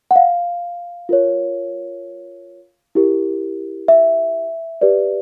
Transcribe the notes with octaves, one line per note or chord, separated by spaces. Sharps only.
F#5
F5
F4 A#4 C#5
E4 G4 A#4
E5
G4 B4 D5